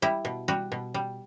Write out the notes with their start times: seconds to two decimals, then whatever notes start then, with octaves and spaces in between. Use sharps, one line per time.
0.02 G3 E4
0.25 B2
0.48 G3 F#4
0.72 B2
0.94 G3